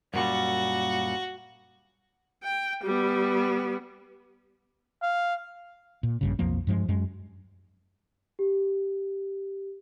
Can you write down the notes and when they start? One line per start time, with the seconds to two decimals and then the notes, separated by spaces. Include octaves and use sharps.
0.14 F#2 A#2 G3 F#4
2.43 G5
2.83 G3 B3
5.02 F5
6.03 A#2
6.21 A#1 G2 C#3
6.39 B1 F2 F3 A#3
6.67 G2 F3 G#3
6.89 F#2 G#3
8.39 G4